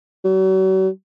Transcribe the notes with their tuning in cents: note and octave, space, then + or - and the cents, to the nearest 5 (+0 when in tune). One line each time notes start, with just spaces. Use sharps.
F#3 +40